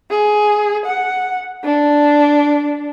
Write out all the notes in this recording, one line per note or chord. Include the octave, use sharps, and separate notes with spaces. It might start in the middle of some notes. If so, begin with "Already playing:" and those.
G#4
F#5
D4